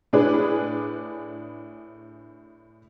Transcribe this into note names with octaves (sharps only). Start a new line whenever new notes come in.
A2 D4 G#4 B4